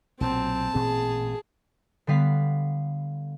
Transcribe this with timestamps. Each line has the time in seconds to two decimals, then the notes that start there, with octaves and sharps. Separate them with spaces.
0.21 B1 A#2 F#3 C4 A5
0.75 A1 A#2 C4 G#4
2.07 D3 G3 B3 F5 B6